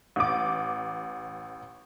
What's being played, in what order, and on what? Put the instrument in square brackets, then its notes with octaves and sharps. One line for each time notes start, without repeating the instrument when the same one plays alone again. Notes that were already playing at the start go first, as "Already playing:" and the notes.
[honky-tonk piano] A1 D6